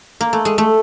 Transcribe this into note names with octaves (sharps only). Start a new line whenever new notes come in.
A#3
A3
G#3
A3